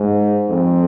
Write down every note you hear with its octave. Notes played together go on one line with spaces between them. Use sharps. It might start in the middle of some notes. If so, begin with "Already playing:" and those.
Already playing: G#2
F2